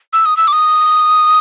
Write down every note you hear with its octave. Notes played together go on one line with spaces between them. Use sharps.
E6
D#6
E6
D6
D#6